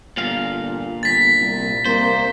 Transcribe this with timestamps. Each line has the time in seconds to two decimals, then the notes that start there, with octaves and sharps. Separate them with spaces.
0.17 G1 A#2 F5
1.03 G1 A6 B6
1.41 C2
1.85 C2 A#3 C5